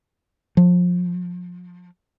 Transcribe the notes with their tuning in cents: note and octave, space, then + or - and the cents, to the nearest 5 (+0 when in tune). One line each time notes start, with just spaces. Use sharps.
F3 +30